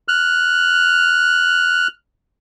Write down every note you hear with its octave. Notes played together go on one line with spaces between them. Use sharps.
F6 F#6